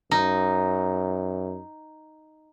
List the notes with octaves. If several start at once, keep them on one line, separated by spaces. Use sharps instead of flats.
F#2 D#4